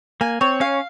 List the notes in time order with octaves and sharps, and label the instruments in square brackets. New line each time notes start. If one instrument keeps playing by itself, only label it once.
[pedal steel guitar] A#3 [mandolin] G#5
[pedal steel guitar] C4 [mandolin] C#5
[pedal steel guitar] C#4 [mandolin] F5